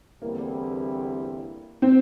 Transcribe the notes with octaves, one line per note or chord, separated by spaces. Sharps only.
E2 D3 G3 A#3 C4 E4
C4